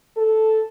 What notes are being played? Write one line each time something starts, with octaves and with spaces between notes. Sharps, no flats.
A4